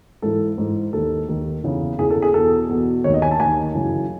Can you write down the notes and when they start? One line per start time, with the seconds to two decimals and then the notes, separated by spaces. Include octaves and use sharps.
0.22 G#2 E3 A4
0.58 G#2 E3
0.93 D#2 D#3 A4
1.29 D#2 D#3
1.64 E2 C#3 E3
1.99 E2 C#3 E3 G#4
2.10 A4
2.22 G#4
2.34 E2 B2 A4
2.69 E2 B2
3.04 D#2 D#3 C#5
3.14 D#5
3.22 G#5
3.31 A5
3.40 D#2 G#5
3.45 D#3
3.75 F#2 C#3 E3